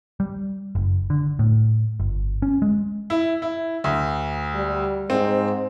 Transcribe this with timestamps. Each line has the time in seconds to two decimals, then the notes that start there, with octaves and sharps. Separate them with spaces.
0.20 G3
0.75 F#1
1.10 D3
1.39 A2
2.00 G1
2.42 C#4
2.62 G#3
3.10 E4
3.42 E4
3.84 D2
4.55 G3
5.10 G#2 C4